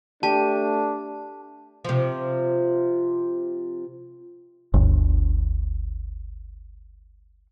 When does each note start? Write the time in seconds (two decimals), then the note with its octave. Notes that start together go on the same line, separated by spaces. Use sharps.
0.23 A3 D4 G4 A5
1.85 C3 F3
4.74 G1 D2